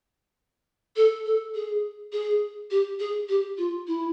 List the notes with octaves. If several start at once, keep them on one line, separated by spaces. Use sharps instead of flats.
A4
A4
G#4
G#4
G4
G#4
G4
F4
E4